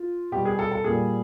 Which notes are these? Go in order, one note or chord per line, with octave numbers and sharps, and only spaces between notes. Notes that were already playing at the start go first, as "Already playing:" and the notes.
Already playing: F4
B2 G3 G4
G#4
A4
A4
A#2 G3 G#4